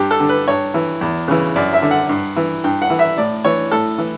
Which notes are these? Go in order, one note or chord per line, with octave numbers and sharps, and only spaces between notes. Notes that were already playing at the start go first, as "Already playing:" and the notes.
Already playing: G2 G4
A4
D3
B4
G2 C#5
E3
E2
C#3 E3
F#2 D5
E5
D3
F#5
G2
E3
G2 G5
F#5
E3
E5
A2 D5
E3 C#5
A2 A4
E3